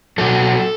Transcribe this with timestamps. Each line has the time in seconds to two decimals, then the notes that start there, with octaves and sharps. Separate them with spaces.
0.18 B2 F#3 A4